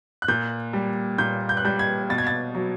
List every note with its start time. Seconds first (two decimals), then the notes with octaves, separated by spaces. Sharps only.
0.22 F#6
0.28 A#2 G6
0.73 G3
1.18 A#2 G6
1.49 G6
1.57 F#6
1.65 G3 G6
1.79 G#6
2.10 B2 A6
2.18 G#6
2.27 A6
2.55 F#3